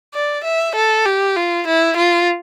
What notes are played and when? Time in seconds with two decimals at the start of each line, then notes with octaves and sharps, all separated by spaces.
0.14 D5
0.44 E5
0.76 A4
1.05 G4
1.36 F4
1.67 E4
1.97 F4